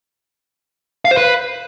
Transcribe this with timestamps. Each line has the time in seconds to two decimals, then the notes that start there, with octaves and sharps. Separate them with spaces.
1.05 F5
1.11 C5
1.17 B4